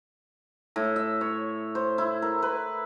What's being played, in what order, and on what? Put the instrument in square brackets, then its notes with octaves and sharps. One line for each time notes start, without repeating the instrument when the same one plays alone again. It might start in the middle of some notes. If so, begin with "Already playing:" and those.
[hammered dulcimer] A2
E5
C#5
C5
E4
A#4
B4